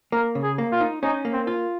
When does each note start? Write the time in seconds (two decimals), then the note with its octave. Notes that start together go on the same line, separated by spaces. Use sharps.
0.12 A#3 A#4
0.35 C#3
0.43 G#4
0.58 A#3
0.72 F4
0.81 D#4
1.03 C#4 D#4
1.25 A#3
1.33 C4
1.47 F4